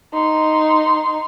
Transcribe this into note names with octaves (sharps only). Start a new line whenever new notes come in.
D#4 C6